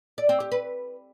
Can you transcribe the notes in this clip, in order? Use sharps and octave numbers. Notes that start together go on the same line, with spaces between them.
D5
C4
G4
B4